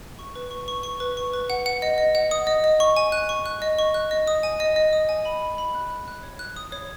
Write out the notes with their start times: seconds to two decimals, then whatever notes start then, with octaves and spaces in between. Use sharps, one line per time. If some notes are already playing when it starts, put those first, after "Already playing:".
0.19 C#6
0.35 B4
0.51 C#6
0.68 C#6
0.83 C#6
1.00 B4
1.17 C#6
1.34 B4
1.50 F#5
1.66 F#5
1.82 D#5
1.98 D#5
2.15 F#5
2.31 D#6
2.47 D#5
2.64 D#5
2.80 C#6
2.96 G#5
3.12 F#6
3.29 C#6
3.46 F#6
3.62 D#5
3.79 C#6
3.94 F#6
4.11 D#5
4.27 D#6
4.43 G#5
4.60 D#5
4.76 D#5
4.93 D#6
5.09 G#5
5.25 B5
5.41 B5
5.58 B5
5.75 F#6
5.90 F#6
6.08 F#6
6.23 C#5
6.39 F#6
6.56 D#6
6.72 C#5